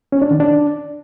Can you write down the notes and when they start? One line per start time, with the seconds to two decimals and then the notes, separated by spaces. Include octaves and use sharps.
0.12 C#4
0.22 D4
0.31 D#3
0.40 D4